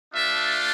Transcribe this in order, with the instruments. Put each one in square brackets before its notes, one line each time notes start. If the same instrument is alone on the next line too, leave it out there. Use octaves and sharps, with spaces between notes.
[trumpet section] A3 D4 F4 E5